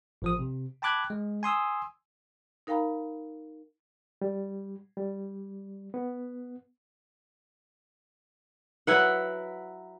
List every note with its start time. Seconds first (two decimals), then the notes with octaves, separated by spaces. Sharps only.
0.22 A1 F3 D#6
0.39 C3
0.82 G5 A5 B5 D6 F#6 G#6
1.10 G#3
1.43 G#5 C6 D#6 E6
2.67 D#4 A#4 F5 G5 A#5 B5
4.22 G3
4.97 G3
5.94 B3
8.87 F#3 E4 B4 F#5